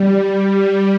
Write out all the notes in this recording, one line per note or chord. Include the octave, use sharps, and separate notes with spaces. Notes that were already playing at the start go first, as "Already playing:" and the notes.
Already playing: G3
G3